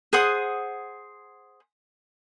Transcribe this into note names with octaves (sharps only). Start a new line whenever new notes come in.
G#4 C5 F#5 D#6